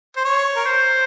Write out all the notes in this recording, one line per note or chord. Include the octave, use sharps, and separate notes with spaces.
C5
C#5
A#4
C5